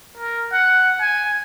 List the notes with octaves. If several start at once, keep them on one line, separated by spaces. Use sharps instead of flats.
A#4
F#5
G#5